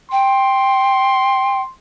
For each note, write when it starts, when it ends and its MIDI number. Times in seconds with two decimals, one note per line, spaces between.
0.12 1.61 79
0.12 1.73 84